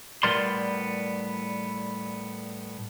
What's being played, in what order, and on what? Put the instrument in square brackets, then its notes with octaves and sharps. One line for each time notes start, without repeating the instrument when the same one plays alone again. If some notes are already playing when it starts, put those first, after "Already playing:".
[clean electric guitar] A2 G3 B3 A#4 D5 C6